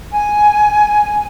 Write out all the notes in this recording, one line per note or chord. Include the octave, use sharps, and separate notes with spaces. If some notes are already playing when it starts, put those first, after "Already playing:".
G#5